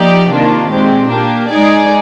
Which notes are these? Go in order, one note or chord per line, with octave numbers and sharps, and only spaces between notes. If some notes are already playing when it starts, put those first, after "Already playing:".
Already playing: F3 A#3 D#4 G4 D5
C3 D#3 A#3 D4 F4
A#2 G#3 C4 G4
A#3 D4 G4
G#3 D#4 G#4 D5